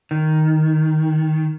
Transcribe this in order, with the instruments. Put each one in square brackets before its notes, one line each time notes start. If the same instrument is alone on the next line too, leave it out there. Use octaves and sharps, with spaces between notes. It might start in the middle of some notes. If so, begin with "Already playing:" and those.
[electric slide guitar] D#3